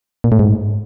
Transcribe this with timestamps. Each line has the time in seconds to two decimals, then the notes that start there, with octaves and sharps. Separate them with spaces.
0.24 A#2
0.32 A2
0.39 G#2